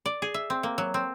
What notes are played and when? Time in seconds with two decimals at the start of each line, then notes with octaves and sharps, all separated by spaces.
0.06 D5
0.22 G#4
0.34 E5
0.50 C4
0.63 A#3
0.78 F#3
0.94 C4